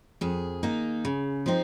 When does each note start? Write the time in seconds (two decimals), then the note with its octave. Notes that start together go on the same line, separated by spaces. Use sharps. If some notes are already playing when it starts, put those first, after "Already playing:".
0.21 F2 G#4
0.63 D#3 A#3 D#4
1.05 C#3
1.46 F3 C4 D#4